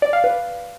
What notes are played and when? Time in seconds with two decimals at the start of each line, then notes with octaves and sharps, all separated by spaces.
0.02 D5
0.13 F5
0.24 B4